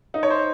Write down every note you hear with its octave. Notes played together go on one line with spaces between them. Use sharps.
D#4
C#5
C5